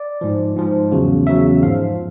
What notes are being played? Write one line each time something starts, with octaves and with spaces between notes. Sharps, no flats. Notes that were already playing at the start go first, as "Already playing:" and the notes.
Already playing: D5
G#2 F3
G#2 F3
E2 C#3 F#3
E2 C#3 F#3 E5
G#2 F3 F5